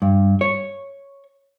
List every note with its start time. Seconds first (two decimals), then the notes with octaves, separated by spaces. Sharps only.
0.02 G2
0.41 C#5